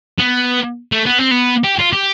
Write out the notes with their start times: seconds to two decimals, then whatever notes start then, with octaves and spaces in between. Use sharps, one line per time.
0.19 B3
0.92 A3
1.06 B3
1.19 C4
1.31 B3
1.64 G4
1.79 F4
1.93 G4